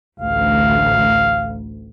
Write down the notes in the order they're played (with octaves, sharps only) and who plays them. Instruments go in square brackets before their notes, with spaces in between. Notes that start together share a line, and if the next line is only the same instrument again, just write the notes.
[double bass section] A1 D2 [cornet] F5